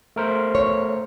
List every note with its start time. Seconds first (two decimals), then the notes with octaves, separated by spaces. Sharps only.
0.16 A3 A#4 C5
0.55 C#5